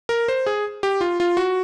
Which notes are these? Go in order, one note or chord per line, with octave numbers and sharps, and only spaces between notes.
A#4
C5
G#4
G4
F4
F4
F#4